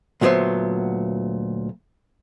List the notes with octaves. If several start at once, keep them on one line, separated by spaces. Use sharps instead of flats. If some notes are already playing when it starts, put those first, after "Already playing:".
D2 A#2 F#3 B3 C5 E5